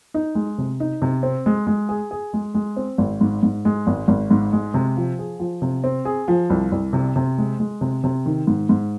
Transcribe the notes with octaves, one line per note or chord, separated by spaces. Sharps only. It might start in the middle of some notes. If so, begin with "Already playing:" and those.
D#4
G#3
C3
D#4
C3
C4
G#3
G#3
G#4
G#4
G#3
G#3
C4
G#1
G#2
G#2
G#3
G#1
G#1
G#2
G#3
C3
F3
G#4
F3
C3
C4
G#4
F3
C2
C2
C3
C3
G#3
G#3
C3
C3
D#3
G#2
G#2